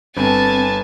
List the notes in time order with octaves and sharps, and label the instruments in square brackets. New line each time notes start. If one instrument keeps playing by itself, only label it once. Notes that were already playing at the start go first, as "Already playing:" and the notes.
[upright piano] G1 [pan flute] C4 [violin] G#5 A5